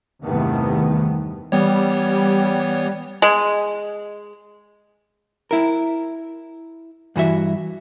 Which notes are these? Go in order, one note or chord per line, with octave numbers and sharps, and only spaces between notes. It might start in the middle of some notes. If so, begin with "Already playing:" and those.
E2 G2 C3 D#3 A3 B3
E3 G3 B3 C#5
G#3
E4 A#4
G2 E3 F#4 E5